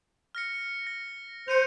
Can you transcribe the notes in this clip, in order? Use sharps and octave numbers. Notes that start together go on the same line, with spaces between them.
F6 A#6 C#7
A#6
C5 C#7 D#7 F7